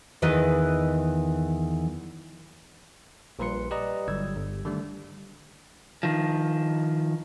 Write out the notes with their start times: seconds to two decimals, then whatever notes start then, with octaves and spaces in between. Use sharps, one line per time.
0.22 E2 D#3 E3 B4 D#5
3.39 A#1 A#2 G3 B4 C6 C#7
3.71 G4 B4 D5 D#5 A#5 D#6
4.08 G1 D3 F#3 G3 E6 G#6
4.37 G1
4.65 D3 D#3 G3 A3 D4
6.03 D#3 F3